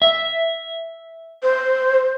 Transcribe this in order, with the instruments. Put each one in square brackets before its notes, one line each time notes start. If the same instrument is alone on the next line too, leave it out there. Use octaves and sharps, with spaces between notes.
[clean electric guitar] E5
[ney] C5